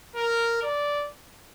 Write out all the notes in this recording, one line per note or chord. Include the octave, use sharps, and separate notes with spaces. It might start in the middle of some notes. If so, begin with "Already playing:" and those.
A#4
D5